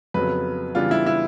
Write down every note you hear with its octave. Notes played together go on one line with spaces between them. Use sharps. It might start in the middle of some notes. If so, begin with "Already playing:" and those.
F2 C#3 F#3 B3 B4
C#3 E3 G3 B3 D4 F4
E4
E4